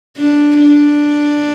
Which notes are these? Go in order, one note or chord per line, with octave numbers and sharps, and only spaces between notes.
D4
D4